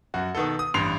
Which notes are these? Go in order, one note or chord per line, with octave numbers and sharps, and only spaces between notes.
F#2 F#4
B2 D#3 B3 A4
D#6
A1 G2 C6 C7 F7